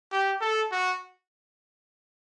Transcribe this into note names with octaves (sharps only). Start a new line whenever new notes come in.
G4
A4
F#4